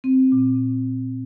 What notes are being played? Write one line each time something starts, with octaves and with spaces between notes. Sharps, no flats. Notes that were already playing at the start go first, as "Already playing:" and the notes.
C4
A#2